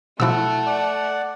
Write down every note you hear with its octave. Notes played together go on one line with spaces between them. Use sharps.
B2 F3 F#3 A3 E4 F#5 E6
D5 F#5